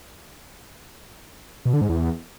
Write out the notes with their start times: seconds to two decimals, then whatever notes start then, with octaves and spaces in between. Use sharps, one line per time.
1.65 B2
1.73 D3
1.81 G#2
1.89 E2